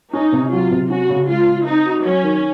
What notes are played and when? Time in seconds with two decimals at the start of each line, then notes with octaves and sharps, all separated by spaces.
0.13 C#4 D#4
0.32 C3
0.52 F#3 F4
0.71 C3
0.90 C#4 F#4
1.09 C#3
1.28 G#3 F4
1.47 C#3
1.66 C4 D#4
1.86 F#4
2.05 F#3 C#4
2.23 D#3